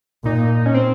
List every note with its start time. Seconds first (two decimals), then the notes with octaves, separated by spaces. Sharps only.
0.25 A#2 D#4
0.66 C#4
0.74 C4